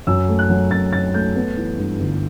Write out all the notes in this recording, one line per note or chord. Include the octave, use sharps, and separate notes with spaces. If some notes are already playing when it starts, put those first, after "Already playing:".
F#2 E6
A3
F#6
F#3
F#2 A6
F#2 A6
A3 G6
B3
E3
G2
G1